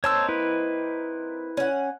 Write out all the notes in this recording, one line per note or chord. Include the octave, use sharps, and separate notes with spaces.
A#3 C4 D#4 C#5 A5 E6
E4 B4
C#4 F#5